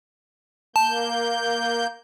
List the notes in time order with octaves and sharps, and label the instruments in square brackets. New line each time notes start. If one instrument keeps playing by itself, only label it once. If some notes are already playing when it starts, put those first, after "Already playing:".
[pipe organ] A#3 G6 [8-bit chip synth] A5